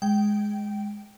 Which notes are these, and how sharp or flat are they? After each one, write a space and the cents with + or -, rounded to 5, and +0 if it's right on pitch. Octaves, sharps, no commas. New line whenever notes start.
G#3 +0 G5 -15